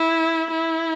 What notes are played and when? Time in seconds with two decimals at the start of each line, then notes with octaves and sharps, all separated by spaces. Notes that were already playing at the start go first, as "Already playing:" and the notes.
Already playing: E4
0.51 E4